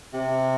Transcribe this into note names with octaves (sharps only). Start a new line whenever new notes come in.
C3